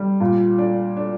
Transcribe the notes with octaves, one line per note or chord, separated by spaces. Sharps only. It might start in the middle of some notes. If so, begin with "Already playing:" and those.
Already playing: G3
A#2
D4
D4